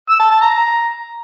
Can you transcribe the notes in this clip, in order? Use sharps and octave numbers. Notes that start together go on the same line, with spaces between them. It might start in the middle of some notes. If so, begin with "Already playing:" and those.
E6
A5
A5
A#5